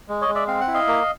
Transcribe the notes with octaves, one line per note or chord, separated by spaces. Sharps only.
G#3
C#5 D#5
G#3
D5 E5
C4 F5
F#5
E4
D#5 F5
A#3